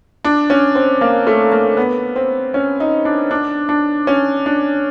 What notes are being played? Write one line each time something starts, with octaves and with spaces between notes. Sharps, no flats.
D4
C#4
C4
A#3
A3
A#3
B3
C4
C#4
D#4
D4
D4
D4
C#4
D4